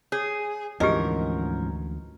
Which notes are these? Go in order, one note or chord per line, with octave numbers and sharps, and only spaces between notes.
G#4 C#5
D2 G#2 E3 F3 C#4 G4 A#4 D#5